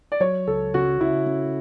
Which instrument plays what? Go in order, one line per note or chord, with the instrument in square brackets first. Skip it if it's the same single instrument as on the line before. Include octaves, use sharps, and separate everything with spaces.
[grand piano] D5
[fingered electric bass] F#3 [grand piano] C#5
[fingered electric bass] C#2 [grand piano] A4
[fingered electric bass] C#3 [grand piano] F#4
[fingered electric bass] C#3 [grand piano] E4
[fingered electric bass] C#4